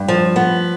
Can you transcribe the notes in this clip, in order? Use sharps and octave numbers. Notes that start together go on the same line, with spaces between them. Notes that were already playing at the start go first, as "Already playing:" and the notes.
Already playing: G2
F3
B3